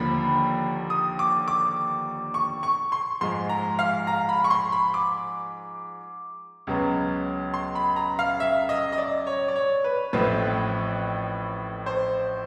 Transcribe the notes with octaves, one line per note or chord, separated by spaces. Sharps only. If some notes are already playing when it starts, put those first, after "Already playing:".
Already playing: D#2 D3 F3 A#3 B5
D#6
D6
D6
C#6
C#6
C6
G#2 F3 G#3 C6
A#5
F5
A#5
B5
C#6
C6
B5
D6
C#2 C#3 F#3 B3
C6
B5
A#5
F5
E5
D#5
D#5
D5
C#5
D5
C#5
B4
A1 A2 F3 A3 C4 B4
C5